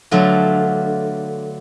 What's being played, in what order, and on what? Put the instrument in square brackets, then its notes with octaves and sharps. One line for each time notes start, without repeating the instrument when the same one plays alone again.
[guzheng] D3 F#3 A3 B3 F4